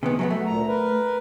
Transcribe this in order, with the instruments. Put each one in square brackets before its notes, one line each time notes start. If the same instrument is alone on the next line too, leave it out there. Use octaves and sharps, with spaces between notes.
[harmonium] D2 G#4 [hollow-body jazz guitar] C3 D#3 B3
[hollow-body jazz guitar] F#3 A3 B3 [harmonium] F#4
[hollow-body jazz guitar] A3
[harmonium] D2 A#2 A#5
A#4 B4